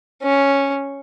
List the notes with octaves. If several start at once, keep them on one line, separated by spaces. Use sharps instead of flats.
C#4